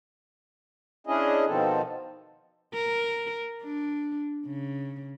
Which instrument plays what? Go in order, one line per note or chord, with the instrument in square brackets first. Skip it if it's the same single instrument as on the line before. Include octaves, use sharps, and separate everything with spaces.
[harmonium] C#4 D4 E4 G#4 D#5
B2 D#3 F3 C4 A4
[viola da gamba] A#4
D4
C#3